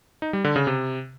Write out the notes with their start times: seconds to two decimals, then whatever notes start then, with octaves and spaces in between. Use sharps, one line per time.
0.22 D#4
0.33 G3
0.44 D3
0.56 C#3
0.67 C3